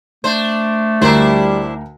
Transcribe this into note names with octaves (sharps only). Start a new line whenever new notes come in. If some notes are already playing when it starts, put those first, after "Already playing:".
A3 D4 C5
D2 G3 D4 E4 A#4 C5 A#5